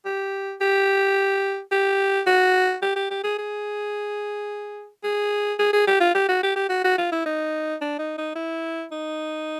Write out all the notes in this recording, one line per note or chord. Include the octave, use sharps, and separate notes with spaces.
G4
G4
G4
F#4
G4
G4
G4
G#4
G#4
G#4
G#4
G#4
G4
F4
G4
F#4
G4
G4
F#4
F#4
F4
E4
D#4
D4
D#4
D#4
E4
D#4